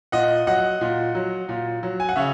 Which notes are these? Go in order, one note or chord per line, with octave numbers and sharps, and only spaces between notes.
A#2 D#5 F#5
F#3 D#5 F#5
A#2
F#3
A#2
F#3
G#5
F#5
C#3 C#5 E5